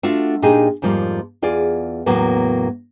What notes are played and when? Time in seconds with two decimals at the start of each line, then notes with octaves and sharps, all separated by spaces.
0.03 A3 D4 F4 F#4
0.42 A#2 D4 D#4 G4 G#4
0.82 F2 G#2 F3 G3 A#3
1.42 E2 F4 G#4 D5
2.06 E2 A2 C#3 F#3 A#3 B3